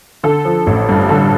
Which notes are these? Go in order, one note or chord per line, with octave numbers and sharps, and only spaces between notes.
D3 A4
F3
A1
G2
D3 A4